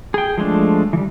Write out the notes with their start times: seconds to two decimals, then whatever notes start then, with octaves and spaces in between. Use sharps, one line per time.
0.14 G#4 G5
0.37 F3 G#3 A3 D4
0.93 E3 G3